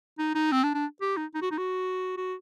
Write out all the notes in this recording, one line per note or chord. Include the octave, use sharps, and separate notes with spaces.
D#4
D#4
C4
D4
D4
G4
D#4
D#4
F#4
D#4
F#4
F#4